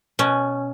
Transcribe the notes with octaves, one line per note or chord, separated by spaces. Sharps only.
B2 C#4